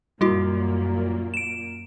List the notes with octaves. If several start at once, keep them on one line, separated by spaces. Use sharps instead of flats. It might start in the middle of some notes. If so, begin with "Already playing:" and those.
F#2 A#2 G3 A#3 E4 F#4
D7 E7